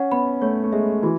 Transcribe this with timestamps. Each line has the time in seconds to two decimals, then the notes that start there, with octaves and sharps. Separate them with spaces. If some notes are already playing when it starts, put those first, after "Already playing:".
Already playing: C#4 F#5
0.12 B3 B5
0.42 A3 C#5
0.64 A3
0.72 G#3 E5
1.03 E3 F#4